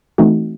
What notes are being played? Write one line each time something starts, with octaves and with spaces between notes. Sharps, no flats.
E3 A3 C4 D#4 F#4